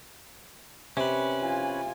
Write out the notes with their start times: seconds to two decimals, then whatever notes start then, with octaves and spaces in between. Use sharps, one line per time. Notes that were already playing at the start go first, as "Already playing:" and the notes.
0.97 C3 C#4 B4
1.42 F4 G#5